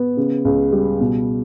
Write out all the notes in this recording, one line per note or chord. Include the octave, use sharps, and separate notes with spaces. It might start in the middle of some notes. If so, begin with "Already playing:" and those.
Already playing: B3
C#3
C#2
G3
B2